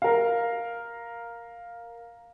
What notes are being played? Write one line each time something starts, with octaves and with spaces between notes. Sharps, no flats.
A#4 F5